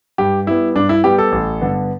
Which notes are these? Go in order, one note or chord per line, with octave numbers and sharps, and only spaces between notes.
G2 G4
G3 B3 E4
G2 D4
E4
G3 B3 G4
A4
A1
G2 D3 B3